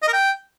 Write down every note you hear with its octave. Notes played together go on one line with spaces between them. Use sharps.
D#5
A#4
G5